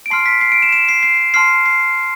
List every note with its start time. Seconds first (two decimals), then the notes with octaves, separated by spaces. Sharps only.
0.06 D7
0.10 A5 C6 F6 C7
0.26 B6
0.41 C7
0.52 D7
0.62 E7
0.73 E7
0.89 C7
1.03 C7
1.34 A5 C6 F6 C7
1.66 C7